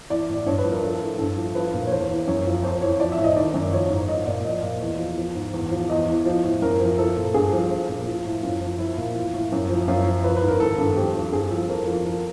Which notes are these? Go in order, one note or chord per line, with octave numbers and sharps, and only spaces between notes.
E3 D5
A2
G2 C#5
B4
F3
A#4
F3 A4
A2
G2 A4
F3
F3 B4
A#2
C#5
E2 C5
E3
F#2 C#5
F3
F2 C5
E3 C#5
F3 D5
E5
A2
D#5
D#3 D5
F#2
F3 C#5
G#2
F3 D#5
A#2 D5
F3 D#5
A#2
E2
F3
F3
G#2
E2
F3
E2 D#5
E3
F3
A2
F#2 A#4
F3
F3 A4
A#2
G2 G#4
F3
F3
A#2
F3
A2
F#2 F4
F3
F3 E4
A#2
E3 F4
A2
F#2
F3
F#2 F4
F3
F3 B4
B4
G#2
A#4
D#3 A4
G2
F2 G4
F3
G2 G#4
F3 A4
F2 A#4
F3
F3 A#4